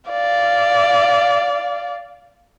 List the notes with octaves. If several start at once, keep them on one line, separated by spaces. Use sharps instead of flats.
D5 F5